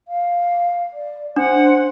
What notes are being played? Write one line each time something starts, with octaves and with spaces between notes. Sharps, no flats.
F5
D5
D4 C5 F#5